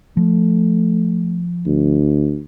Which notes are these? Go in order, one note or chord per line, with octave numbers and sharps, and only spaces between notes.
F3 A3
D2